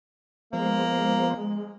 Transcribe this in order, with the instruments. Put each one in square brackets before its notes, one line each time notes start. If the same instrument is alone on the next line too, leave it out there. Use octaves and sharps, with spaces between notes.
[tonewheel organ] F3 B3 C5 [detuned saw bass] G#3 [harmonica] A#3